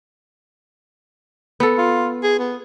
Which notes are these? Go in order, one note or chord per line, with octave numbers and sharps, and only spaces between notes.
B3 A4
F4
G#4
B3